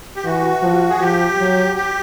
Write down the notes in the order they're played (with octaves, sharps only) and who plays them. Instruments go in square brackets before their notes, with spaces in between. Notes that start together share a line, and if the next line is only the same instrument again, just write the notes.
[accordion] G4
[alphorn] E3 [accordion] F#4
[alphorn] F3
[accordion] G#4
[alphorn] F3 [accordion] G4
[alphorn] F#3
[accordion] G4